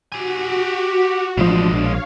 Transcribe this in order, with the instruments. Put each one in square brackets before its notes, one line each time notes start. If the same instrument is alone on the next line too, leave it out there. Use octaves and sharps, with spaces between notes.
[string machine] F#4 [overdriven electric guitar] G4 G#5
[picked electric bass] A1 F3 [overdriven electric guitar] B2 G#3 [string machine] D4
[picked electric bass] A#1 [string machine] C#5 F5